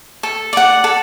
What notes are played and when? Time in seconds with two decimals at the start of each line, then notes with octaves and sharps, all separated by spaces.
0.23 A4
0.53 D5 F#5
0.84 A4